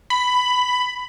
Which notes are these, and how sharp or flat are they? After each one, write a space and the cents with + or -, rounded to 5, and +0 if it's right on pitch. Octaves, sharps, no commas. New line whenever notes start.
B5 +10